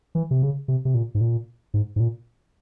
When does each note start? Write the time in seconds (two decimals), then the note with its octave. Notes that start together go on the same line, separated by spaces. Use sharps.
0.15 E3
0.31 C3
0.42 C#3
0.68 C3
0.85 C3
0.95 A#2
1.15 G#2
1.21 A#2
1.74 G#2
1.96 G#2
2.00 A#2